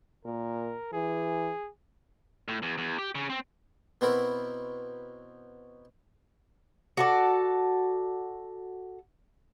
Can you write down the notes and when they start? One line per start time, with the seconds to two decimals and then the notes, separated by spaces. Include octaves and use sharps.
0.25 A#2 A#4
0.93 E3 G#4
2.48 A2
2.62 E2
2.78 E2
2.99 G4
3.15 C#3
3.30 C4
4.01 B2 B3 C4 E4 F#4 A#4
6.97 F#4 A4 D5